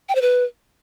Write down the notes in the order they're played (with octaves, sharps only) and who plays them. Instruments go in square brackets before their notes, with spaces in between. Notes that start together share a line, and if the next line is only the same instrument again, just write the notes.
[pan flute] G5
C5
B4